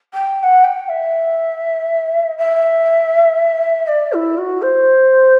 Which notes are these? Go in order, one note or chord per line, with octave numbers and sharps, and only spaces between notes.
G5
G5
F#5
G5
E5
E5
D5
E4
F#4
C5